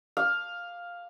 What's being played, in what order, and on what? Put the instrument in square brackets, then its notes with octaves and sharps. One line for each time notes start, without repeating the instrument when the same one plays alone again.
[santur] F5